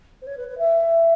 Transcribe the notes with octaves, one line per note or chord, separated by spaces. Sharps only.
C5
C#5
B4
B4
E5